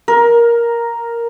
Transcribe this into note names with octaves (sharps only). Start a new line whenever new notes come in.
A#4